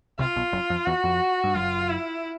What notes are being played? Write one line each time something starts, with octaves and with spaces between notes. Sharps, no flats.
C2 C3 F4
B1 B2
F#1 F#2
F2
E2 F#4
F2
G2
F#1 F#2 F4
E4